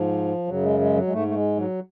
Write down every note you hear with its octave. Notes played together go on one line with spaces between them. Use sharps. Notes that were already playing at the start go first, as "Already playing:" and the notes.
Already playing: G#2 F3
F#2 C#3 F#3
G#3
G#3
F#3
G#3
G#2 A3
A3
G#3
F#3